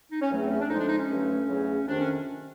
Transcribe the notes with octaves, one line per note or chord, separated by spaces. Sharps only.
D#4
C#4
E2 C#3 F#3 A3
C4
C#4
D4
F2 D3 F3 G#3 D#4
D4
D#4
C#4
G2 D3 F#3 A3
E2 C#3 F#3 A3
F2 C3 D#3 D4
C#4